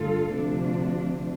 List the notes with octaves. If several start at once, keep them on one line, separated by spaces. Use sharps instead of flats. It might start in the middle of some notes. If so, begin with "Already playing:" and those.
Already playing: G2 D3 A3 F4 A4
D2 C3 F3 D4